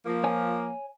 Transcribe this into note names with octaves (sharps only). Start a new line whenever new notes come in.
F3 A#3
C#5 G#5